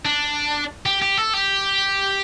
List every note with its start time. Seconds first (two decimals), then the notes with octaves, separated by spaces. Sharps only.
0.05 D4
0.86 G4
1.02 G4
1.17 A4
1.34 G4